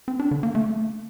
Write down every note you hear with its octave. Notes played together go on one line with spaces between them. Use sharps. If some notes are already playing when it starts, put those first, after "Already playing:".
C4
D4
D3
A#3
A3